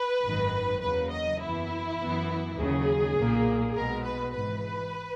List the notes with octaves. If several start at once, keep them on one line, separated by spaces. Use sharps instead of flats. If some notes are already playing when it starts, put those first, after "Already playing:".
Already playing: B4
G#1 F#2 D#3
E2 C#3 F#3 A#3 B4
D#5
F#2 E3 B3 E4
F#2 E3 B3
D#2 C#3 F#3 G#4
B1 A#2 A#3
B1 B2 G#3 B3 A#4
B4
G#1 G#2 E3 B4